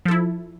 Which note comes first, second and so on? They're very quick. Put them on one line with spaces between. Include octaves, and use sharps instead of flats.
F3 A4 E4